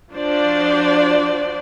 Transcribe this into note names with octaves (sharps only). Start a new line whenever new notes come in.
F3 D4 F#4 C5 D5